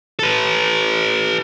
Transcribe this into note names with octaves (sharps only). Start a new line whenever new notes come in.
A4 B4